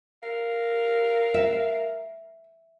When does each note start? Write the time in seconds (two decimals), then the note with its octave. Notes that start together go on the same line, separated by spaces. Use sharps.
0.23 A#4 F5
1.34 E5